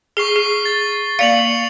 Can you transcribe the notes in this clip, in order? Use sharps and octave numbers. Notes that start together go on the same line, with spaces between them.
G#4 C#6 C7 G7
G#4 C7
A6
A#3 D5 F5 C#7 F7 F#7